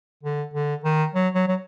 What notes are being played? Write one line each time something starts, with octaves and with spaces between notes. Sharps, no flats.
D3
D3
D#3
F#3
F#3
F#3